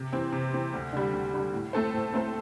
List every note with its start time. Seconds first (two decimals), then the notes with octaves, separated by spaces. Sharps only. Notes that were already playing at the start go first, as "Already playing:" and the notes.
Already playing: C3
0.13 E3 C4
0.32 C3
0.53 E3 C4
0.74 D2
0.93 D3 G3
1.13 D2
1.33 D3 G3
1.54 A2
1.73 A3 C4 A4 C5
1.94 A2
2.14 A3 C4 A4 C5